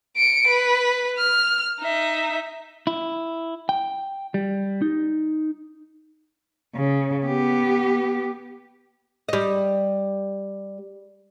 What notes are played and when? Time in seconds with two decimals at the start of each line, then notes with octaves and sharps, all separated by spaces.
0.17 C#7 D7
0.48 B4
1.17 F6
1.80 D#4 E5
2.87 E4
3.69 G5
4.34 G3
4.82 D#4
6.76 C#3
7.26 B3 G4
9.29 G3 D#5